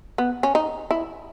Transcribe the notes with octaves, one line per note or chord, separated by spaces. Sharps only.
B3
C#4
D#4
E4